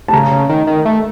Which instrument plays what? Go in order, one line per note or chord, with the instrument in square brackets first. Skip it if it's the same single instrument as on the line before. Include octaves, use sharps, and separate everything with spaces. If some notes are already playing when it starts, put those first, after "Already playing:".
[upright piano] A5
[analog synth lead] C#3 [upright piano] A#5
[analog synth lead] C#3
D#3
D#3
A3